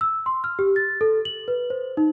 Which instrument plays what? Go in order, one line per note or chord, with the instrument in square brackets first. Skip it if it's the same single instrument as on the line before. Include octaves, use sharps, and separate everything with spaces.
[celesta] E6
C6
F6
G4
A6
A4
F#7
B4
C5
D#4